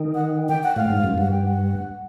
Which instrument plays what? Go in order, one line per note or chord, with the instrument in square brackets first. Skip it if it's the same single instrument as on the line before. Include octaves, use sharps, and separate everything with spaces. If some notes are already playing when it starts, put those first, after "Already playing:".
Already playing: [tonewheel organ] D#3
[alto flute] F#5
G5
F#5
[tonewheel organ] A2 [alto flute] F5
[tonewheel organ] G#2
F#2
[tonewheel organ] G2 [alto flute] F#5
[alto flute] G5
F#5